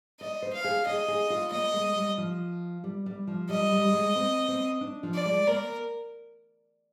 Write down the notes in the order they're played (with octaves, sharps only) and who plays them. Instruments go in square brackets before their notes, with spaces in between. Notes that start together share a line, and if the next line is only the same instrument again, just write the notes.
[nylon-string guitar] D5 [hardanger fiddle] D#5
[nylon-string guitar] C5
[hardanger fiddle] F5
[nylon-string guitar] G#4
[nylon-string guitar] G#4 [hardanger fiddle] D#5
[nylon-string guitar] G#4
F4
[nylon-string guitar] A#3 [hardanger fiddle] D#5
[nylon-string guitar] G#3
G3
F3
G3
G3
F3
[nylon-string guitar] G3 [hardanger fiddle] D#5
[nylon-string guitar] G3
G3
G#3
C4
C4
D4
F3
[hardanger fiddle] D5
[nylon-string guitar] G#3
[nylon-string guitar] A#3 [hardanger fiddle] A#4